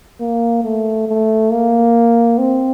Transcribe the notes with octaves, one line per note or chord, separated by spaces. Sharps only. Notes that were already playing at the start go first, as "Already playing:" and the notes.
A#3
A3
A3
A#3
C4